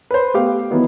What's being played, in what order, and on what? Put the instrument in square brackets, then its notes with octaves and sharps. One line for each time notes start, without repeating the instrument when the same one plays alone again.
[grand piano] B4 C5
A3 B3 G4 F5 D6
D#3 E3 F#3 B3 E4